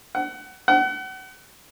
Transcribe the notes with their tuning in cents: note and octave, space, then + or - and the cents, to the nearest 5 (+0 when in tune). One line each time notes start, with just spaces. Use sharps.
F#5 +25
F#5 +35